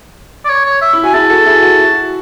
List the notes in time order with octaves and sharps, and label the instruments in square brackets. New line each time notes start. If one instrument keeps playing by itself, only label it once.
[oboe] D5
C#5
C#5
E5
[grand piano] E4
[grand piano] F#4 [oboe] G#5
[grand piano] E4 G#4 [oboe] A5
[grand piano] F#4 A4
E4 G#4
F#4
F#4